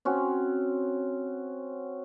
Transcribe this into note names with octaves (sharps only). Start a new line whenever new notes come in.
C4 C#4 F#4